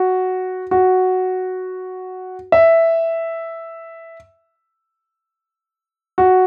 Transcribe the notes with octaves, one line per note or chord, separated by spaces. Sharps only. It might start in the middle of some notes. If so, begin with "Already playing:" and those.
Already playing: F#4
F#4
E5
F#4